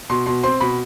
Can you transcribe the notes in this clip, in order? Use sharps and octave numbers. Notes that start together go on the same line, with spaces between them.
B2 C6
B2 C6
C4 C6
B2 B5